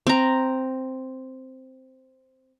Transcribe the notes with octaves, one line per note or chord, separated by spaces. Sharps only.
C4 A#5